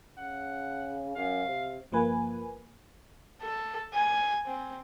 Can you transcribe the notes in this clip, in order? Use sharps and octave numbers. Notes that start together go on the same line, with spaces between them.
C#3 F#5
F#2 F5
C3
G1 F3 A#3 B4 G#5
A4
G#5
C4